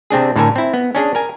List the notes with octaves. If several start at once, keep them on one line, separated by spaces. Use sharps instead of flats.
C3 C4 D4 G#4
A2 D3 A4 A#4 G#5
C4 E4
B3
C#4 D4 G#4
A#4 G#5